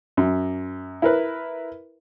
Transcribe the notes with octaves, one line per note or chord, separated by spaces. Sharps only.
F#2
E4 A#4 B4